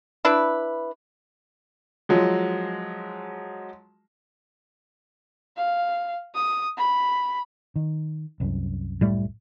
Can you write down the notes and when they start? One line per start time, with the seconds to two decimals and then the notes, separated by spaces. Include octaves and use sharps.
0.25 D4 E4 B4
2.09 F3 F#3 G#3
5.57 F5
6.35 D#6
6.78 B5
7.76 D#3
8.40 C2 F#2
9.01 A2 G3 A3